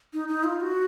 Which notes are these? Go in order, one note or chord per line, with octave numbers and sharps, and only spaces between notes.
D#4
D#4
F4
F#4